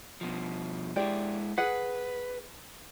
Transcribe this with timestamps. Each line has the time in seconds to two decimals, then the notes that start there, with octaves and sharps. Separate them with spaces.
0.21 B2 F3
0.96 G#3 E4 G4 D5
1.58 G#4 B4 F#5